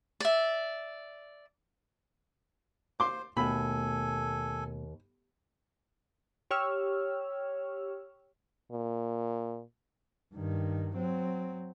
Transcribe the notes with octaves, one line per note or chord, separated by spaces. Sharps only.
D5 E5
C5 C6 D6
D#2 B2 A3 A4 G#5 B5
G4 C#5 E6 F6
A#2
G2 D#3
F#3 C4